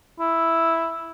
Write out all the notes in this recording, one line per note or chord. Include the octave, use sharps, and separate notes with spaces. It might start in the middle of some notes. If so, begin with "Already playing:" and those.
E4